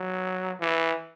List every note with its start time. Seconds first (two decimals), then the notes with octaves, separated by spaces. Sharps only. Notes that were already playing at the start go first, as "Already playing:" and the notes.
Already playing: F#3
0.60 E3